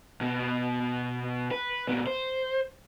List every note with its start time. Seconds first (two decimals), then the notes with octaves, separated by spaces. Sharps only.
0.21 B2 B3
1.51 B4
1.87 A#2 B3
2.07 C5